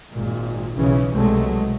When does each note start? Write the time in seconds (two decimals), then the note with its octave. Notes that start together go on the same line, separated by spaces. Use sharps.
0.12 G#1 A#2
0.74 B1 C#3 E3 C#4
1.12 C2 B2 F#3 G#3 A3